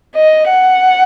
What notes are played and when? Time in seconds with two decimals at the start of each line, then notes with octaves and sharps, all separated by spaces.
0.16 D#5
0.50 F#5